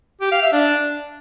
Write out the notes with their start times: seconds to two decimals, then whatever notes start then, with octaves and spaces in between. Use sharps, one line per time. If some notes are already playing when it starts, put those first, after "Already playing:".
0.21 G4
0.32 F5
0.42 E5
0.53 D4